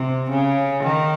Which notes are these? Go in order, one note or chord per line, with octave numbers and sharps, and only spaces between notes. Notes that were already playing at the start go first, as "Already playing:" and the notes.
Already playing: C3
C#3
D#3